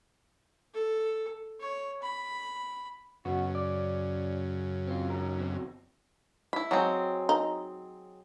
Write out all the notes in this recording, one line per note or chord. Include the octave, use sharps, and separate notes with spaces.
A4
C#5
B5
F#2 C#3 B3 F#4
D5
C4 F4
G#2 A#4
E2 F#3 C4
E4 B5
F#3 G#3 C4
D#4